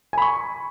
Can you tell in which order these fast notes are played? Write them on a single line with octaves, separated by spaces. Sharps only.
G#5 B5 C#6